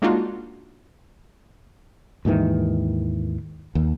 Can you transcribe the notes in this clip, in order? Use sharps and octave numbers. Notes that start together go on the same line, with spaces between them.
G#3 A#3 D4 D#4 F4 F#4
D#2 G#2 D#3 E3
D#2